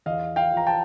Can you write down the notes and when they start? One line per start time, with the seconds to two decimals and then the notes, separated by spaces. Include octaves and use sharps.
0.06 E2 D#5 F5
0.36 F5 G5
0.52 F3 A#5
0.67 G5 A5